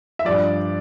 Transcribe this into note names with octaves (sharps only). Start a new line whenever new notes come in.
E5
G2 F3 D5